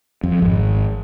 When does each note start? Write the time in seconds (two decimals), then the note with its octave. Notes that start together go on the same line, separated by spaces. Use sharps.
0.24 F2
0.42 G#1